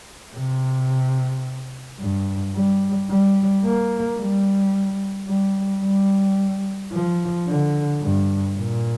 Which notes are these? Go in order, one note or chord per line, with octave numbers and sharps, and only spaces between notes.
C3
G2
G3
G3
A#3
G3
G3
G3
F3
D3
G2
A#2